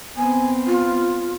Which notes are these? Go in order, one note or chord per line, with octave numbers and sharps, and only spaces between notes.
B3 C4 G#5
F4